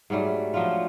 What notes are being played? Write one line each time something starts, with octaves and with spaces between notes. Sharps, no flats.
G#2 F#3 G3 A3
F3 F#3 D4 F4